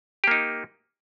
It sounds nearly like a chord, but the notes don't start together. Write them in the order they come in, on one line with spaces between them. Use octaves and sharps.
G4 A#3 D#4